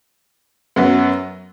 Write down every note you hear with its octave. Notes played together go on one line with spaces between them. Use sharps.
F#2 F#3 B3